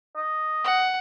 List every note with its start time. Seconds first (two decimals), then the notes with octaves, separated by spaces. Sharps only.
0.17 D#5
0.64 F#5